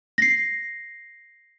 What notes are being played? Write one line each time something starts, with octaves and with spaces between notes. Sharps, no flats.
A#6 C7